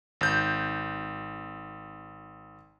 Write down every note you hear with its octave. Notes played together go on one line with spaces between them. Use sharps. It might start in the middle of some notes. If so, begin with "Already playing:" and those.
G#1 G6